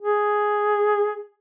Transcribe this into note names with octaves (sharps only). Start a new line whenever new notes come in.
G#4